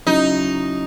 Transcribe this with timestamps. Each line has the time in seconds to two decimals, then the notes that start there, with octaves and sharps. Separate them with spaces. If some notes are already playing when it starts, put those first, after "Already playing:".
0.07 C#3 F#3 C#4 D#4 E4